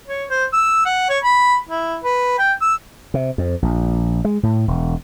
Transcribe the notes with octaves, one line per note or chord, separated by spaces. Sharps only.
C#5
C5
E6
F#5
C#5
B5
E4
B4
G5
E6
C3
F2
A#1
G#3
A2
E1